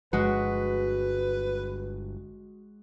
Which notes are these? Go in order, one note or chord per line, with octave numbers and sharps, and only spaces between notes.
G1 G#3 F#4 B4